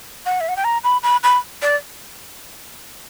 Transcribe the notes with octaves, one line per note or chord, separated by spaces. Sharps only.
F#5
E5
F#5
G5
A#5
B5
B5
B5
D5